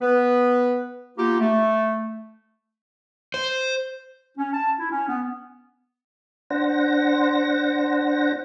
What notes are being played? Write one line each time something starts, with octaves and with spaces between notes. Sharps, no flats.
B3 B4
A#3 B3 D#4 F4 G4
A3
C5
C#4
A5
E4
C#4
B3
D4 C5 F#5 A#6